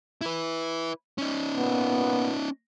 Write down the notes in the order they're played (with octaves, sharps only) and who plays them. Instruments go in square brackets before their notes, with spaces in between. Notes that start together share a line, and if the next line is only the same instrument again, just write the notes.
[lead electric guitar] E4 B4
C#4 D#4
[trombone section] A#2 B3